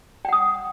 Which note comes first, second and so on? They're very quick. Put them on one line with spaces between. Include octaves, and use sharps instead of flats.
G5 F#5 D#6